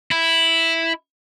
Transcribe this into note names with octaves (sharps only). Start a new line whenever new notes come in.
E4